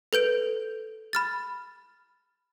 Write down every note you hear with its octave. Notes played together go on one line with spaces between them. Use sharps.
A4 B4 G6 D7
B5 F6 A6